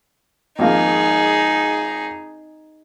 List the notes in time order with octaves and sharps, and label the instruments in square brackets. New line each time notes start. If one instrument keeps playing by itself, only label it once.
[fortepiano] G#1 F3 A#3 [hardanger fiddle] D#4 G#4